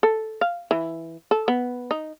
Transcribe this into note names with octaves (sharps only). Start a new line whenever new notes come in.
A4
F5
E3
A4
B3
D#4